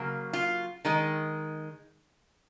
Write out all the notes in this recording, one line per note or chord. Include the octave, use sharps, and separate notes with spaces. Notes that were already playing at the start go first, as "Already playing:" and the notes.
Already playing: C#3 F#3 A#3
F4
D#3 G#3